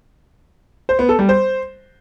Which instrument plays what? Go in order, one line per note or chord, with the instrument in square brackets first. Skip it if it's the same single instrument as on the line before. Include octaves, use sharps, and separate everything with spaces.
[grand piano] C5
B3
A4
G3
C5